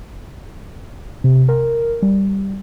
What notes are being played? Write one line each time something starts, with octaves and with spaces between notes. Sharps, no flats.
C3
A#4
G3